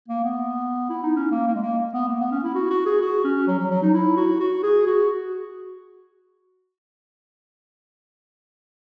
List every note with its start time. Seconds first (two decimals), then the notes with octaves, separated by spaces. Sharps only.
0.08 A#3
0.24 B3
0.90 E4
1.03 D#4
1.16 C#4
1.31 A#3
1.47 A#3
1.55 G#3
1.62 A#3
1.93 B3
2.08 A#3
2.20 B3
2.32 C#4
2.43 E4
2.55 F#4
2.70 F#4
2.86 G#4
3.01 F#4
3.24 C#4
3.47 F#3
3.59 F#3
3.70 F#3
3.83 D#4
3.94 E4
4.17 F#4
4.40 F#4
4.63 G#4
4.87 F#4